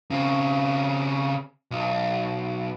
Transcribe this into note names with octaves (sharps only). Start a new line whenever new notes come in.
C#3 C4
B1